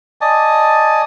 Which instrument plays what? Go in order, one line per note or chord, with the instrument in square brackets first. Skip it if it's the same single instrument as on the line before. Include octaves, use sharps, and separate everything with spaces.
[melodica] D5 D#5 G#5 A5